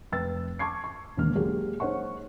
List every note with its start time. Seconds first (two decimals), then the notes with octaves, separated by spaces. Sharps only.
0.12 F1 B4 G5 E6 A6
0.59 A5 C#6 D6 G#6 C7
0.84 C#6
1.17 E1 D#2 D3 A#3 F6
1.35 F#3 G#3 A#3 G4 G#4
1.80 D#4 C5 C#5 F#5 C#6